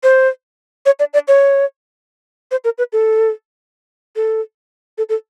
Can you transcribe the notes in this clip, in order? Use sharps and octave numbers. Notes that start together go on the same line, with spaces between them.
C5
C#5
D5
D5
C#5
C5
A#4
B4
A4
A4
A4
A4